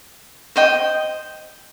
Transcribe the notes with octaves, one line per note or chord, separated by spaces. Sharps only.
C5 D#5 G5